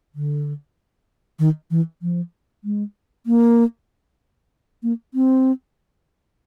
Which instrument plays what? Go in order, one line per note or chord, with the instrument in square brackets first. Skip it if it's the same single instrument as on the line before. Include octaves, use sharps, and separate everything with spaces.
[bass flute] D3
D#3
E3
F3
G#3
A#3
A#3
C4